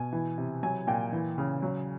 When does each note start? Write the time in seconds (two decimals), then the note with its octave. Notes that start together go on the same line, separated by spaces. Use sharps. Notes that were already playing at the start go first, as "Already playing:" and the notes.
Already playing: B2 G#5
0.12 E3
0.38 C3
0.63 F#3 G#5
0.87 A#2 G5
1.12 E3
1.38 C#3
1.62 F#3